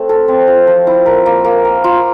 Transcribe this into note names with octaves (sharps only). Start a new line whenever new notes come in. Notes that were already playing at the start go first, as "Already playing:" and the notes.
Already playing: A3 C4
A4
C4
F3
F3
E4
A#4
A#3
A#3
A#4
F4